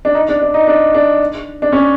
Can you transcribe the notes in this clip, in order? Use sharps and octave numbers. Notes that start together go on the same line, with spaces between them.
D4
D#4
D4
D4
D#4
D4
D4
D4
C#4